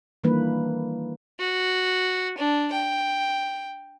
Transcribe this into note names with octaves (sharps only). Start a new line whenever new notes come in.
D#3 E3 G3 A#3 D4 B4
F#4
D4
G5